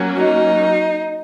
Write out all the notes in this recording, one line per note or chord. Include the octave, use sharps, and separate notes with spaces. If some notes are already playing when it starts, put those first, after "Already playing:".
Already playing: F#3 A#3 C#4 F#4
D#4